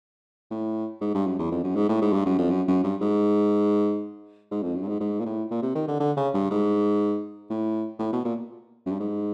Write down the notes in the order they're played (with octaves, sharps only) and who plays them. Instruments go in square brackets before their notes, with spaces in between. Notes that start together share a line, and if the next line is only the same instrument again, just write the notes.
[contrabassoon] A2
G#2
G2
F#2
E2
F2
F#2
G#2
A2
G#2
G2
F#2
F2
F#2
F#2
G2
G#2
G#2
F2
F#2
G2
G#2
G#2
A#2
A2
A#2
C3
D#3
D3
D3
C#3
G2
G#2
A2
A2
B2
A#2
F#2
G2
G#2